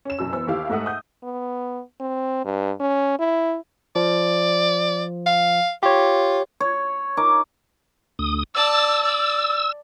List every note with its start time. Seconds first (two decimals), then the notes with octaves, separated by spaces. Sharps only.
0.05 C#4 E7
0.19 C2 F#2 B2 E6
0.33 E3 B3 C5 E6
0.47 D#2 E4 G4 F5
0.70 G#2 A3 E5 F#5 D#6
0.86 D#6 G6
1.23 B3
2.00 C4
2.45 G2
2.80 C#4
3.19 E4
3.96 F3 D5
5.26 F5
5.83 F4 G4 C#5
6.60 C#5
7.17 D#4 A#4 D6
8.19 D2 D#6
8.55 D5 A5 E6
9.03 D5